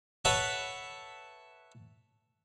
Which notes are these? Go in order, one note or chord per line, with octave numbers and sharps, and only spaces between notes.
A4 B4 C#5 E5 F#5 A5